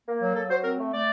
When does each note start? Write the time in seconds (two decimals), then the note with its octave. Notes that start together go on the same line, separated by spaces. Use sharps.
0.08 A#3
0.22 F#3
0.35 F#3 A4
0.50 F#3 C5
0.64 C4 A#4
0.79 A3
0.93 A3 D5